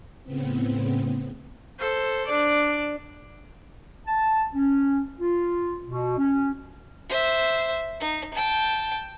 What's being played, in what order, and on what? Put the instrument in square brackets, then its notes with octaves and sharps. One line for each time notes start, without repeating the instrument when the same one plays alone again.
[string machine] A2 C#3 B3 C4
[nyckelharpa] A4 C5
D4 D5
[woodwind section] A5
C#4
F4
B2
C#4
[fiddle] C5 E5
D#4
G5 A5